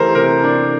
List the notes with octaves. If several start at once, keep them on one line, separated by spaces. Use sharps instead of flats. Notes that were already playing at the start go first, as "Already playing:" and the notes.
Already playing: E3 A3 G4 A4 A#4 C5
C3 A#4
D4